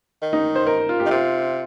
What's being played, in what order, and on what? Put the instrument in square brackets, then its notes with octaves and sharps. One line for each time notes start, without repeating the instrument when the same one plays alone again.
[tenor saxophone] D#3
[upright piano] D#4
C5
A#4
F4
G4
[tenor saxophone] D#3
[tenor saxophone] C3 [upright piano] F4